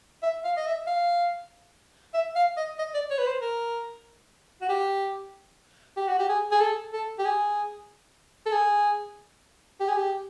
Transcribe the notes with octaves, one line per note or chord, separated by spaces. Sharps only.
E5
F5
D#5
E5
F5
E5
F5
D#5
D#5
D5
C#5
B4
C5
A#4
F#4
G4
G4
F#4
G4
G#4
G#4
A4
A4
G4
G#4
A4
G#4
G4
G#4
G4